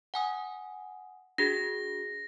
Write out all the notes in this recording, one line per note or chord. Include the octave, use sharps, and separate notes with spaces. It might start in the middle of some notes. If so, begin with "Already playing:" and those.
F#5 G#5 D#6
D4 F#4 G#4 A#6